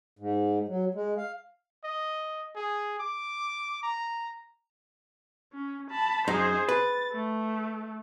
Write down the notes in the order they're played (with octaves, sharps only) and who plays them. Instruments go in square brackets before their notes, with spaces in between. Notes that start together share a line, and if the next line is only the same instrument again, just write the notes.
[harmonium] G#2
F#3
G#3
F5
[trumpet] D#5
G#4
D6
A#5
[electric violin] C#4
A5 B5
[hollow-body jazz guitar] F#2 D#4 [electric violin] G#4 C5
[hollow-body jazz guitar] B4 [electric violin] A6
[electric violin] A3